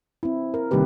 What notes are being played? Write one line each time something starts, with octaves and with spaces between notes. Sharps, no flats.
C4 E4
A#4
C3 D#3 G3 A#3 G4 B4